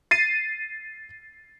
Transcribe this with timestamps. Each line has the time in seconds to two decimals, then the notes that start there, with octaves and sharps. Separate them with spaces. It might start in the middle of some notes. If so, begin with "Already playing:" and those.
0.11 A6 C7 D#7